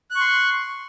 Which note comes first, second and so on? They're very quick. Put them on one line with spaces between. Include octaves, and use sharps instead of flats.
F#6 C#6 C6